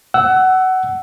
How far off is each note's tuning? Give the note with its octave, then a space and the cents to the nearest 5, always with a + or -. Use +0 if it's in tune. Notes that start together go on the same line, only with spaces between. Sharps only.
F#5 +20 E6 +0